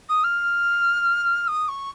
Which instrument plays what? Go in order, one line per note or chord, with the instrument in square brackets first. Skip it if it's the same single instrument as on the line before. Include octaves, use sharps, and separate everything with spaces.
[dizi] D#6
F6
D#6
C#6